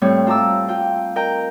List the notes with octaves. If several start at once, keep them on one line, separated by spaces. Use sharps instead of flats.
A2 G3 A3 C4 C#5
F4 A5 A#5 D6 E6
F4 G5
A#4 D#5 G5 A#5